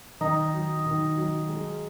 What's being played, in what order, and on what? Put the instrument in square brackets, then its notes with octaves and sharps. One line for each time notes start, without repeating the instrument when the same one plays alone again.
[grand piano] D#3 [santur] D#4
[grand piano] F#3
D#3
F#3
G#3